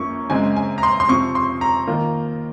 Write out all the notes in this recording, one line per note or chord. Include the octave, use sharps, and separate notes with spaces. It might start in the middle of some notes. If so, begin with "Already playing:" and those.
Already playing: F#2 F3 A#3 C#4 C#6
F#2 C#3 G#3 C4 G#5
G#5
A#5
C6
C6
F2 C3 F3 C#6
C6
A#5
D#3 A#3 F4